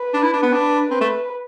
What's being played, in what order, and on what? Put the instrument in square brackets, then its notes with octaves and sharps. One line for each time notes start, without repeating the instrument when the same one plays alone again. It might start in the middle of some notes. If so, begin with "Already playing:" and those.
Already playing: [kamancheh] B4
[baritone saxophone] D4
E4
D4
B3
[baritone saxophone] D4 [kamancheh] B4
[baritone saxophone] C4 [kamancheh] B4
[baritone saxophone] A3